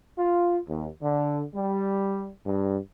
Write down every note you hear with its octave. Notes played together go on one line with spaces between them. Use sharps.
F4
D#2
D3
G3
G2